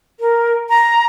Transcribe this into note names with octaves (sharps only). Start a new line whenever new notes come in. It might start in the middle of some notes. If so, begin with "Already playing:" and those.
A#4
A#5